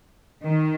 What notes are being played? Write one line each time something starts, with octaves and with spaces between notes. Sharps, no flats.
D#3